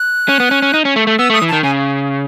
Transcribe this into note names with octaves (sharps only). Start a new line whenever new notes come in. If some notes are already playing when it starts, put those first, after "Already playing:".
Already playing: F#6
C#4
B3
C#4
C#4
D#4
C#4
A3
A3
B3 E6
A3
D#6
E3
D#3 A5
C#3 G#5